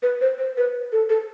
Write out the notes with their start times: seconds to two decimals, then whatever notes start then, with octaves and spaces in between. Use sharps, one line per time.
0.02 B4
0.21 C5
0.38 C5
0.57 B4
0.92 A4
1.09 A4